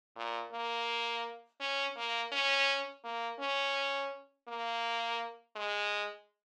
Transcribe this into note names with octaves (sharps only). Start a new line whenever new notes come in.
A#2
A#3
C#4
A#3
C#4
A#3
C#4
A#3
G#3